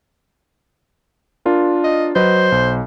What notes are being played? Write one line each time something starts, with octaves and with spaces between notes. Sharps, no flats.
D4 F4 A#4
D#5
F#3 B4 C5 D#5
B1